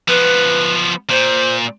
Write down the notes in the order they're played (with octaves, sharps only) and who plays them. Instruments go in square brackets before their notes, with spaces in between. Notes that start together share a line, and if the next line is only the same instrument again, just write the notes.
[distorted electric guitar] F3 B3 [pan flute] B4
[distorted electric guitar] A#2 [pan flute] C5